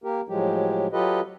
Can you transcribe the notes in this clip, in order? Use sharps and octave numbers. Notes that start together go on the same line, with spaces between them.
A#3 G4 A#4
A2 F3 F#3 G#3 G4
F#3 F4 G4 A4 B4 D#5